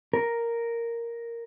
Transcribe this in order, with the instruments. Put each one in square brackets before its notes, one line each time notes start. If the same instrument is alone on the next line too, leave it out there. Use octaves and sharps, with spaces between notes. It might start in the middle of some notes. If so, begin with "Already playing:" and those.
[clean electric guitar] A#4